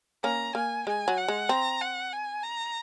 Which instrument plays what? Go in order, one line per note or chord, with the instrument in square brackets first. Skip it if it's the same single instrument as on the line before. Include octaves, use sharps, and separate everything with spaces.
[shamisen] A#3 C#4 [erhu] A#5
[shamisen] A#3 [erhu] G#5
[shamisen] G#3 [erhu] G#5
[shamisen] F#3
[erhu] F#5
[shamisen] G#3
[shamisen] C4 [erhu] A#5
[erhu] F#5
G#5
A#5